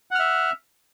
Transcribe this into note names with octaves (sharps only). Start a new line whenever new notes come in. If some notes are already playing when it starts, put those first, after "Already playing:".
E5 F#5 F6